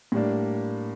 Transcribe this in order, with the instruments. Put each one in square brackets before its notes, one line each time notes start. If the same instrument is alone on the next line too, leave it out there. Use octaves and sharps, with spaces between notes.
[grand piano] A2 G3 A#3 D4